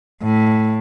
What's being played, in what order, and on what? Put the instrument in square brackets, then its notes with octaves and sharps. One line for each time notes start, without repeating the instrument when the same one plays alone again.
[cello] A2